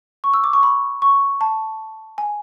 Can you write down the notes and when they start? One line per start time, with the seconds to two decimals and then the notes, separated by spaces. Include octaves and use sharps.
0.24 C#6
0.34 E6
0.44 D6
0.53 C#6
0.63 B5
1.02 C#6
1.41 A5
2.18 G#5